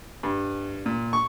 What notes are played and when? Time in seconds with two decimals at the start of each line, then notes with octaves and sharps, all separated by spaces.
0.23 G2
0.86 A#2
1.13 C#6